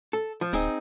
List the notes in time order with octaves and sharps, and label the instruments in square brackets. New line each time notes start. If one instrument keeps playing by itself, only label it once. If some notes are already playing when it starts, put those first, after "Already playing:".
[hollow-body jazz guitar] A4
F3
[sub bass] D1 [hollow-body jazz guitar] C4 D#4 G#4